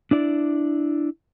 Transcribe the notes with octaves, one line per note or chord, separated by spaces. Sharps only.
D4 E4 D5